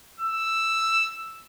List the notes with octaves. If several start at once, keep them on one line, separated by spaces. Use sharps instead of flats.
E6